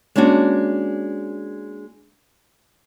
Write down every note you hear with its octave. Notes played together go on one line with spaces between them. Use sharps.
G#3 A#3 C#4 D4 F#4